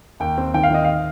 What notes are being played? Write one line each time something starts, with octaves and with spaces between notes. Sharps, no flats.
D#2 G5
C4
D#3 G5
F5
D#3 D#5
F5